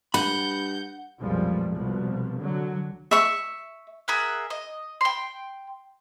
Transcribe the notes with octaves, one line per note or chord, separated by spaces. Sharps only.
G2 F#5 B5 G6
B1 F2 A#2 F3 G3 G#3
C2 B2 F3
D3 F#3
E5 C#6
G#4 A#4 E5 F#5
D#5
G5 C6